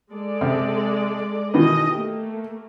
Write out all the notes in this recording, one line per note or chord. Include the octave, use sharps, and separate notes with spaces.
G#3 A4 D5
C3
B2 D#3 E3 D#5
A3 A#3 G4